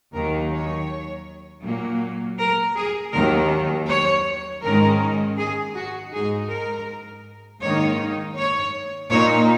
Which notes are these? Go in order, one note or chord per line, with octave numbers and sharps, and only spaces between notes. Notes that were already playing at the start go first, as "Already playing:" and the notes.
D#2 D#3 F#3 A#4
C#5
A#2 F#3 A#3
A#4
G#4
D#2 D#3 F#3 A#4
C#5
G#2 D#3 G#3 C#4 A#4
G#4
F#4
G#2 G#3 D#4 G#4
A#4
G#2 D#3 A#3 D#4 C#5
C#5
A#2 A#3 D#4 C#5